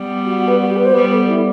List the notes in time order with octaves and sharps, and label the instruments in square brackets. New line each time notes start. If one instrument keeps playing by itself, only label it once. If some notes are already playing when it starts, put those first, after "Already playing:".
Already playing: [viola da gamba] G3 B3
[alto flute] F#4
F#4
B4
F#4
G4
B4
C5
[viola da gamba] G3 B3 [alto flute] B4
[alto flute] A4
E4